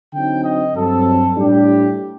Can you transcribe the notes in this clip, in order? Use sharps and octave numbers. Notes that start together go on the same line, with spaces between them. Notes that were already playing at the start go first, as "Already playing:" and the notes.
D3 F#3 C4 D#4 G5
D#5
G2 F#3 C4 A4
A2 G3 D4 G4